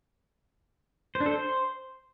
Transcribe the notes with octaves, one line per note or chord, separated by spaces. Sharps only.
C5
D4
A4
C5